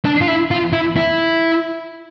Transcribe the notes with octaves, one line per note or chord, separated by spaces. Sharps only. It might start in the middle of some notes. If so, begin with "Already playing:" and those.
D4
F4
E4
F4
E4
E4